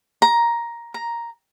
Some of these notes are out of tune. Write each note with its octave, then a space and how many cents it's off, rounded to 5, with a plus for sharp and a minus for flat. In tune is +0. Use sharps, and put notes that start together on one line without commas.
A#5 +10
A#5 +5